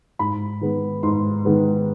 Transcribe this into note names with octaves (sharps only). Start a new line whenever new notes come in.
G#2 B5
D#3 G#3 B3
G#2 C6
D#3 G#3 B3